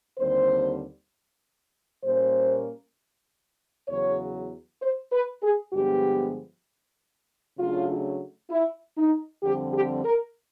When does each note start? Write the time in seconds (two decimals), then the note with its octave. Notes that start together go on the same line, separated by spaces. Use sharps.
0.18 D#2 D3 G3 C4 C5
2.04 A#2 G3 A#3 C#4 C5
3.88 E2 C#3 F#3 C#5
4.82 C5
5.12 B4
5.42 G#4
5.73 G2 D3 F3 G#3 B3 G4
7.58 C#3 F#3 A3 D4 F4
8.50 E4
8.97 D#4
9.43 F2 D3 G3 C4 G4
9.74 G4
10.05 A#4